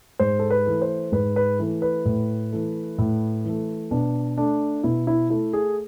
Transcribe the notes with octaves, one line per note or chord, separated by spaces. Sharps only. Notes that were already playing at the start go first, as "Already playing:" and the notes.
G#2 C5
A4
B4
E3 A3
C5
G#2 B4
B4
E3 A3
B4
A2
E3 A3
A2
E3 A3
B2 D4
A3 D4
B2 E4
E4
A3 E4
G#4